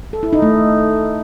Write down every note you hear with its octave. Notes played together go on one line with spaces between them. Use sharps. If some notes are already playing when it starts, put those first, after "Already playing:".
A4
E4
D#4
A3